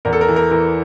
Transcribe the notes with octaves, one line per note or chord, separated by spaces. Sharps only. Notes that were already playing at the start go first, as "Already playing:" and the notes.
E2 A#4
A4
A#4
E3
A#4
E3 A#4